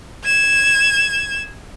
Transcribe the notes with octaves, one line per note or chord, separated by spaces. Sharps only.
G#6 E7